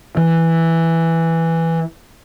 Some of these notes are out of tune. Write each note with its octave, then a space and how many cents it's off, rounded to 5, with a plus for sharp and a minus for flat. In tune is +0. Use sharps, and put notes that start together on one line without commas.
E3 +0